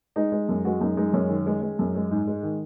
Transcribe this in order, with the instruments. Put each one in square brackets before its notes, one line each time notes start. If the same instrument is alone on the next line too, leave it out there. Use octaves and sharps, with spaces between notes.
[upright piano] G#3 D#4
G#3
F#2
G#3 F#4
F#2 D#4
G#3 D#4
F#2 C#4
D#3
G#3
G#3
F#2
G#3
G#2
G#3
D#3